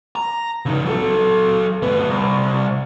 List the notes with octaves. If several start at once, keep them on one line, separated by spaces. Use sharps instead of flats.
A#5
C#3 D#4
F#3 A4
D2 B3
C2